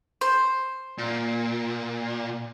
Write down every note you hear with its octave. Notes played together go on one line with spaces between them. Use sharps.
C5
A#2